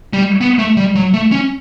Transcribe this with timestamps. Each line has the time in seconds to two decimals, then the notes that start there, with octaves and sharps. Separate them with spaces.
0.13 G3
0.41 B3
0.59 A3
0.77 G3
0.95 F#3
1.14 A3
1.32 C#4